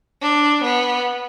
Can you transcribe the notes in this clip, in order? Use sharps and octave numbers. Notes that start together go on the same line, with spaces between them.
D4
B3